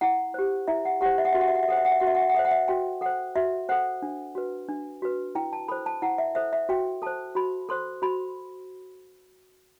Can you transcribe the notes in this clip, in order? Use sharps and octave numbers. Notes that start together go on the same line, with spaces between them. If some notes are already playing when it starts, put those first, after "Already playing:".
E4 F#5
G4 C5
E4 E5
F#5
G4 C5 F#5
E5
F#5
F#4 E5
F#5
E5
F#5
E5
A4 C5 F#5
E5
F#5
E5
F#4 F#5
E5
F#5
E5
F#5
A4 C5 E5
F#5
E5
F#4 G5
A4 C5 F#5
F#4 E5
A4 C5 F#5
D4
F#4 B4
D4
F#4 B4
E4 G5
A5
A4 C5 B5
A5
E4 F#5
E5
A4 C5 E5
E5
F#4 G5
A4 C5 A5
F#4 B5
A4 C5 C6
F#4 B5